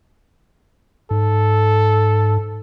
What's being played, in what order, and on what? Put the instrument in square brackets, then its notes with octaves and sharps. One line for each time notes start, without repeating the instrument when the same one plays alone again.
[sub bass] G#2 [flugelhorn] A4